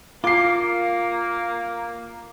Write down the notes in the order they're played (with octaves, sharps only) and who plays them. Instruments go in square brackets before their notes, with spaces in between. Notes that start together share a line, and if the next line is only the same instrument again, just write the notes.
[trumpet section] A#3 [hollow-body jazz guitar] F4 [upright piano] D6 C7